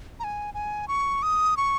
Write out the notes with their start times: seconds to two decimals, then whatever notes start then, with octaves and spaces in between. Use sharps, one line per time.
0.20 A#5
0.24 G#5
0.54 G#5
0.88 C#6
1.23 D#6
1.57 C#6